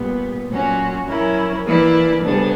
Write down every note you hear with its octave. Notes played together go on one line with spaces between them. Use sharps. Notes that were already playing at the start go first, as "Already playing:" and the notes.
Already playing: A#2 G3 B3
A#2 F#3 C#4 F#4
F#3 C#4 E4 A#4
E3 A#3 E4 B4 D5
D2 C#3 G3 B3 D4